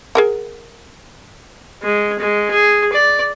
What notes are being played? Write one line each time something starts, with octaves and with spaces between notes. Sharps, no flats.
G#4 A#4 F#5
G#3
G#3
G#4
D5